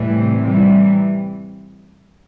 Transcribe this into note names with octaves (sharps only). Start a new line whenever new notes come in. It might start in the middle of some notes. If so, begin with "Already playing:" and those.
Already playing: A2 E3 G3
C3 C4
C3 E3 G3